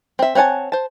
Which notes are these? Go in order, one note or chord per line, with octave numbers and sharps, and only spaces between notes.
C4 E5
C4 C#5 F#5 G#5 A5
C5 A5